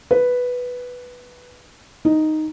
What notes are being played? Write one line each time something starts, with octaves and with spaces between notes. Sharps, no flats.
B4
D#4